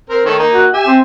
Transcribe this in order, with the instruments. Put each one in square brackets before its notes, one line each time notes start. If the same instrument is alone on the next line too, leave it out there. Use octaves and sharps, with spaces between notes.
[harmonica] C4 A#4
D#3 A3 C#5
A#3 D#4
[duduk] F#4
[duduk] G4 [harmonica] E5 G#5
[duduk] C4